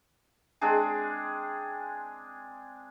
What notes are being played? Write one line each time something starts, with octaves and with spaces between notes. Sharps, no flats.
G#3 C4 D4 G#4